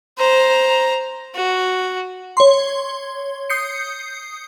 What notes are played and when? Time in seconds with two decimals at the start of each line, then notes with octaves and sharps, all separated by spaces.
0.18 C5 A#5
1.35 F#4
2.37 C#5 C6
3.50 D#6 G6 C7 C#7